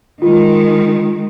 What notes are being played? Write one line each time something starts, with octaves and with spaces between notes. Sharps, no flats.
D#3 G#3 F4